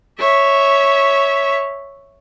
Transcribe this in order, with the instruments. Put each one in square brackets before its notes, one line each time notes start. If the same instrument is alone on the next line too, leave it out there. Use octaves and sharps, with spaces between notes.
[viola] C#5 E5